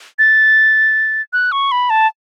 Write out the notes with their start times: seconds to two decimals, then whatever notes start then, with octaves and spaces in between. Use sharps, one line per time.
0.19 A6
1.33 F#6
1.52 C#6
1.72 B5
1.90 A5